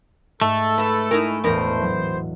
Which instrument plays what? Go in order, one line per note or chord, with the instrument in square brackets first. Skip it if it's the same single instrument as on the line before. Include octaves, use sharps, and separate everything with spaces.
[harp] G#2 [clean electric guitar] A3 [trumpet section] A4
[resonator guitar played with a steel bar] B4 E5
[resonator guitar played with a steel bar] D#4 E4 A#4 [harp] G#5 C#6
[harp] E1 E2 A2 [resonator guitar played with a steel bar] B3 A#4 [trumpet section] C5
[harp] F#3